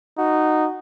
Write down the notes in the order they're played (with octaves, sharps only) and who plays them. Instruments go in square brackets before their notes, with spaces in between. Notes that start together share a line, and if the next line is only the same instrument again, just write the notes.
[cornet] D#4 [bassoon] F#4